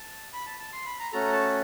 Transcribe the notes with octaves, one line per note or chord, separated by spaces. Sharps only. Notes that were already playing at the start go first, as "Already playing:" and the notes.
Already playing: A5
B5
A5
A5
C6
B5
A#5
A3 C#4 F#4 A4 A#5
A5